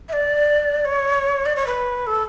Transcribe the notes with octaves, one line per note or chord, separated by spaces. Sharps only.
E5
D5
C#5
D5
C#5
B4
A4